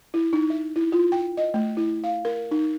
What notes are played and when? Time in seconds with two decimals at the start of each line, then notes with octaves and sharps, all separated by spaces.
0.14 E4
0.33 D#4
0.50 E5
0.76 E4
0.92 F4
1.12 G5
1.37 D#5
1.54 A3
1.77 E4
2.04 F5
2.25 A#4
2.51 D#4